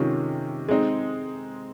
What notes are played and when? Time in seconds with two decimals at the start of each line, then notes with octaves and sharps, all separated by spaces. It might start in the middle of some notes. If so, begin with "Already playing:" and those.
Already playing: C3 D#3 G#3 C#4 F4
0.68 G#3 C4 D#4